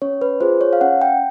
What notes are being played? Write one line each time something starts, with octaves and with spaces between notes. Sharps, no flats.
C#4 C#5
B4
F4 G#4 C5
C#5
F5
C#4 F#5
G5